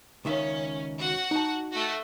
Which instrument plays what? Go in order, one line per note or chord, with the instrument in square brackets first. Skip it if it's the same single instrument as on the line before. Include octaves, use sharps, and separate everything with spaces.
[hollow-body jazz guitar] C#2 D#3 E5 [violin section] C#4
[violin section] F#4 F#5
[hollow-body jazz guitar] D#4 A5
[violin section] A3 F#4